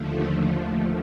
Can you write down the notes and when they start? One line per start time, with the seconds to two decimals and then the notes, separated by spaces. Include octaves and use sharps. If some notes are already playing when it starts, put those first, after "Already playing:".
Already playing: D#2 D3 F3 A3